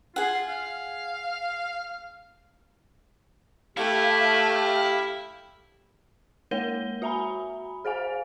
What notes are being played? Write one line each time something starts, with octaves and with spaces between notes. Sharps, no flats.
F4 G#4 F#5
F5
A3 E4 G4 F5
G#3 A#3 A#4 C#5 F#5 G7
F#4 E5 G#5 A#5 B5
G#4 C5 F5 G#5